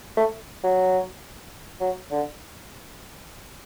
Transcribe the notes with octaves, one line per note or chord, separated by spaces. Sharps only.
A3
F#3
F#3
D3